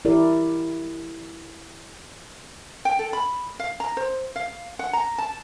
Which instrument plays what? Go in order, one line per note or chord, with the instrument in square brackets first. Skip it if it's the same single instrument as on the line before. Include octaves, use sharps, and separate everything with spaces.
[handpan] E4 G4 A#4 D5
[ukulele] G5
A4
B5
F5
A#5
C5
F5
F#5
A#5
A5